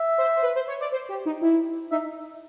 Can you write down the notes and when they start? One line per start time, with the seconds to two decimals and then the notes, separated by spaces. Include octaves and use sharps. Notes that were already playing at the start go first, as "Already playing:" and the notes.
Already playing: E5
0.18 C5
0.36 C5
0.43 B4
0.56 C5
0.68 C#5
0.80 D5
0.92 C5
1.09 G4
1.26 D#4
1.42 E4
1.91 D#4 E5